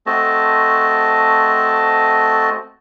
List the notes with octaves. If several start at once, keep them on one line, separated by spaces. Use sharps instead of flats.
A3 C4 F#4 D#5 A5